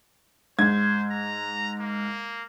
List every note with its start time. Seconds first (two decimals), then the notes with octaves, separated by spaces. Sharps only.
0.59 G#2 C5 G#6
1.11 A#5
1.79 A#3